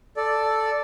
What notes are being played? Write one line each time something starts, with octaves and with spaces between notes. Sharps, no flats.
A4 D5